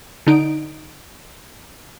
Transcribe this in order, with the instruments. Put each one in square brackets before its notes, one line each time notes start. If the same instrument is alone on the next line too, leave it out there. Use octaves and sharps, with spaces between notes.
[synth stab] D3 D#4 D7